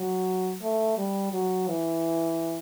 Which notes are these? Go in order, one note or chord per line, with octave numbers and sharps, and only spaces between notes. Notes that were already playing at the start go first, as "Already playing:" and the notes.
Already playing: F#3
A3
G3
F#3
E3